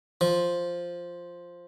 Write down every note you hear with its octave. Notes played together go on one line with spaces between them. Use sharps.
F3